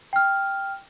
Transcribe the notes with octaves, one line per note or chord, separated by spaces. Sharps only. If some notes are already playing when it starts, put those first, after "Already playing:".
G5 F6